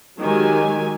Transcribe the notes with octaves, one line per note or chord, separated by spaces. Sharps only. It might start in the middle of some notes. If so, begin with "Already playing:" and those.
D#3 F#3 G#3 G4 G#5